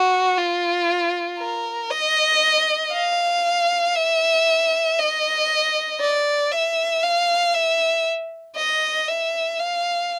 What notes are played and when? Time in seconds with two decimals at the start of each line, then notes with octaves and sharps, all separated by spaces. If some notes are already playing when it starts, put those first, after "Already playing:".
Already playing: F#4
0.37 F4
1.39 A#4
1.90 D#5
2.92 F5
3.95 E5
4.98 D#5
6.00 D5
6.51 E5
7.03 F5
7.54 E5
8.57 D#5
9.08 E5
9.59 F5